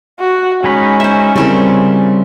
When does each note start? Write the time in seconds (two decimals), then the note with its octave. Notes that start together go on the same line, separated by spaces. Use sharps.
0.20 F#4
0.64 G#3 C#4 D#4 B5
1.00 C5 E5
1.36 C#3 G3 C4 E4 A#4